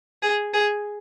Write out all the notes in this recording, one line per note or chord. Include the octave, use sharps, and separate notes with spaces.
G#4
G#4